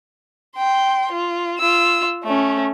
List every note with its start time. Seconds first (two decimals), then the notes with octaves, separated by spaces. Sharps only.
0.56 G5 C6
1.12 F4
1.59 F4 E6
2.24 A3 C#4